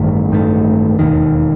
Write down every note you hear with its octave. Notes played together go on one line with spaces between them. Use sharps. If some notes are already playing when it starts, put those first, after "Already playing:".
Already playing: A1 G2 D#3 A3
A1 G2 D#3 A3
E1 D#2 D#3